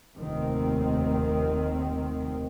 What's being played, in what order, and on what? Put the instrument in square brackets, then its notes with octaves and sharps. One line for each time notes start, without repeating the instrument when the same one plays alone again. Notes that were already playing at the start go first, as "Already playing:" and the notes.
[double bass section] F1 D#2 D#3 C4